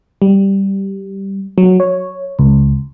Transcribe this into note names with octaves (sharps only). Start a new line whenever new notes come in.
G3
F#3
C#5
C#2